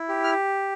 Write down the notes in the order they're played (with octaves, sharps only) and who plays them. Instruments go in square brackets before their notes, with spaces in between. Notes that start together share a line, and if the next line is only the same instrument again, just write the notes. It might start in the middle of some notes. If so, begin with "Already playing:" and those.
Already playing: [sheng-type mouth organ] E4
G4
F6